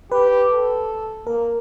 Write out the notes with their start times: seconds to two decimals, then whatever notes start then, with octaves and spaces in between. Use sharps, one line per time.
0.12 G4 B4
0.51 A4
1.27 A#3 A#4